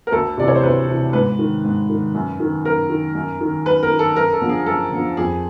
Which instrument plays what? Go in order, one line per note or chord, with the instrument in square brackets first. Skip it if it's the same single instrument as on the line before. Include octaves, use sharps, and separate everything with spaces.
[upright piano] A#4
D2 A4
C3 E3 D5
C#5
C5
D2 B4
C3 E3
G#2 B4
D#3
G#2
D#3
F#2
D#3
F#2 A#4
D#3
F#2
D#3
F#2 B4
A#4
D#3
A4
F#2 A#4
A4
D3 F3
G#4
F#2 A4
D3 F3
F2 G#4